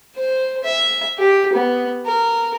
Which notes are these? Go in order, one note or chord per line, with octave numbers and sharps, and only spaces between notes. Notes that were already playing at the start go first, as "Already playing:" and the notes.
C5
E5
G4
B3
A#4